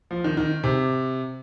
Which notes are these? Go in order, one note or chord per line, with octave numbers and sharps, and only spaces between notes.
F3
D#3
D#3
C3